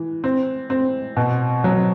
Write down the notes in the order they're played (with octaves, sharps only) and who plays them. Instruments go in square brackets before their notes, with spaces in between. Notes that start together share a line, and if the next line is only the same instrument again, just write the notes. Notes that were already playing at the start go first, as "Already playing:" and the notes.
Already playing: [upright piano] E3
C4
C4
B2
F#3